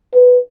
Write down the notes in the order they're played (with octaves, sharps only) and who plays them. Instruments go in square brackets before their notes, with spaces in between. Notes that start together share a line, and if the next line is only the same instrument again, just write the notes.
[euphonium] B4